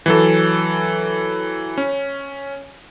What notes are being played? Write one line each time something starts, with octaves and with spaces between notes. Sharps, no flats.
E3 F#3 A4
C#4